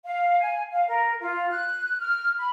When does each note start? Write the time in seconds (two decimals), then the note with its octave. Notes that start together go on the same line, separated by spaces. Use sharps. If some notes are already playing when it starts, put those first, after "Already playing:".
0.05 F5
0.40 G#5
0.71 F5
0.88 A#4
1.20 F4
1.50 F#6
2.00 F6
2.38 B5